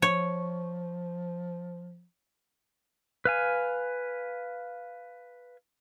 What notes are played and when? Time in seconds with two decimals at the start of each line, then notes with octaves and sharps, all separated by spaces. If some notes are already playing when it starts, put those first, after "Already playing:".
0.02 F3 C#5
3.25 B4 F5 G#5